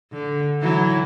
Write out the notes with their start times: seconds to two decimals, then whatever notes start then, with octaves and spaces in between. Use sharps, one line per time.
0.12 D3
0.61 E3 F#3 E4